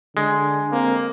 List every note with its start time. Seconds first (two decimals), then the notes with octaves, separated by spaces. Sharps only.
0.17 D3 G#3
0.72 A#3 C4